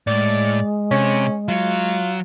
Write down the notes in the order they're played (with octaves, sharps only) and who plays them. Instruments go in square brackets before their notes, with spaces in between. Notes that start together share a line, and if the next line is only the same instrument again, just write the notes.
[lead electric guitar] A2 [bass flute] G#3 [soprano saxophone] D5
[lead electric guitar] C3 [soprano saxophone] C#4
[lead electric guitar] F#3 [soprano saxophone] F4